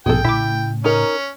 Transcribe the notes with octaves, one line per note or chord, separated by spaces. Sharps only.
A#1 G2 B2 B3 C4 G#4 A4 G5
A2 C#3 A3 E4 D6 B6
C#4 D#4 A#4